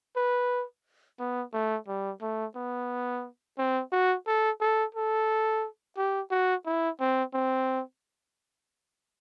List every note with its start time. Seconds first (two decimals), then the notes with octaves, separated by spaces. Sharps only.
0.17 B4
1.20 B3
1.53 A3
1.88 G3
2.22 A3
2.56 B3
3.58 C4
3.92 F#4
4.27 A4
4.61 A4
4.95 A4
5.97 G4
6.31 F#4
6.66 E4
7.00 C4
7.34 C4